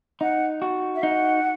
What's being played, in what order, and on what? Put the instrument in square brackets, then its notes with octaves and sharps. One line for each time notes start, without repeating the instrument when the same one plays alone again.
[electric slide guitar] D#4 [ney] F#5
[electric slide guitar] F#4
[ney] E5
[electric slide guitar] D#4 [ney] F#5